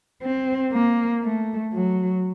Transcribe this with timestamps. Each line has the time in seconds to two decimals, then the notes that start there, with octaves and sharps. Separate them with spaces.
0.23 C4
0.73 A#3
1.23 A3
1.74 F#3